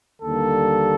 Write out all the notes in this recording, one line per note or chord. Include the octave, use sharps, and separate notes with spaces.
D#2 D3 G3 A#3 A4